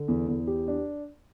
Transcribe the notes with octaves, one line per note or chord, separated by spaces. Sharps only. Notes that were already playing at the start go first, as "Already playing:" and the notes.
Already playing: D3
E2
E2
G4
D4